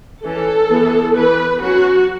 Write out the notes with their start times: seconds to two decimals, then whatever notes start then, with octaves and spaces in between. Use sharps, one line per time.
0.24 E3 C#4 A4
0.70 E3 B3
1.15 E3 B3 B4
1.61 F#3 C#4 F#4